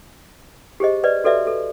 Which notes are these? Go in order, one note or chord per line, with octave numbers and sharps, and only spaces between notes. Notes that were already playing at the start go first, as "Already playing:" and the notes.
G4 G#4 C5 D#5
B4 D5 D#5
F#4 A4 B4 D5 E5
A4